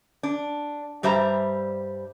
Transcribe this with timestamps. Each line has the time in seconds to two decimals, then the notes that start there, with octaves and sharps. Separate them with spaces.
0.23 D4
1.03 G2 G3 C5 E5 A#5